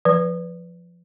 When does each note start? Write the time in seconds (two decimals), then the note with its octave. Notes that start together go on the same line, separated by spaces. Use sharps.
0.05 F3 B4